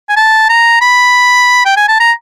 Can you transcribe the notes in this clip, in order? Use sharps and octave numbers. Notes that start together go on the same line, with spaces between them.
G#5
A5
A#5
B5
G5
G#5
A5
A#5